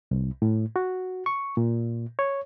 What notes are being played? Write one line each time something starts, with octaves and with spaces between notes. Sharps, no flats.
C2
A2
F#4
C#6
A#2
C#5